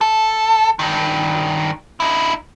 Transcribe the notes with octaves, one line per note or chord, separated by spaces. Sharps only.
A4
G2 D#3
D#4 E4